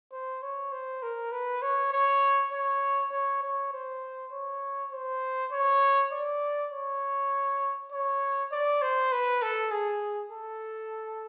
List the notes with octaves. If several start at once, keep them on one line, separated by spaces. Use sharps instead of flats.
C5
C#5
C5
A#4
B4
C#5
C#5
C#5
C#5
C#5
C5
C#5
C5
C#5
D5
C#5
C#5
D5
C5
B4
A4
G#4
A4